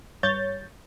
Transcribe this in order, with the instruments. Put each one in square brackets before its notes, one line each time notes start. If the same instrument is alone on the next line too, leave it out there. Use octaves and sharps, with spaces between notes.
[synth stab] G2 C#5 G6 A6